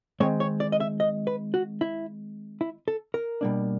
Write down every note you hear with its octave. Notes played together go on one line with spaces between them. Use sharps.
D#3 G#3 C4 C#5
C#5
D5
D#5
E5
D#5
B4
F#4
E4
E4
A4
A#4
B2 G3 A#3 D4